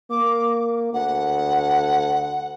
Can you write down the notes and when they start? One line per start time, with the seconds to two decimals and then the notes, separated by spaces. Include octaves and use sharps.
0.10 A#3 D6
0.94 D2 F#5